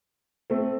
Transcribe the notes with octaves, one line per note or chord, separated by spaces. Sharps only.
A3 C4